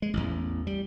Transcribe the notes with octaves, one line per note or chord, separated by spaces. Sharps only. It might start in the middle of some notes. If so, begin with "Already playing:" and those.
G#3
A1 E2
G3